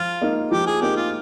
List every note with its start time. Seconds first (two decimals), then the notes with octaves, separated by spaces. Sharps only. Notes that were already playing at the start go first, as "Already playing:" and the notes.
Already playing: F3 F4
0.22 A#3 D#4
0.51 F3 G4
0.66 G#4
0.81 A#3 D#4 G4
0.96 F4